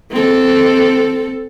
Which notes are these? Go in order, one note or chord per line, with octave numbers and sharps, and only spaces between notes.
C4 A4